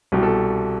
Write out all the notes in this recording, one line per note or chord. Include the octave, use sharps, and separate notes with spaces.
C2 B2 G4
A4